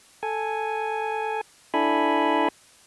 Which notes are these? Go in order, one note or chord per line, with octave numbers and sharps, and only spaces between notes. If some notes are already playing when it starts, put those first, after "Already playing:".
A4 G#5
D4 E4 A4 G#5 B5